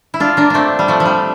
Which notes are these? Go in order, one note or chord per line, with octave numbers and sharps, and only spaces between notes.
E4
D4 F4
A#3 D4
A3 C4 D4
G3
F3 A3
F3
G3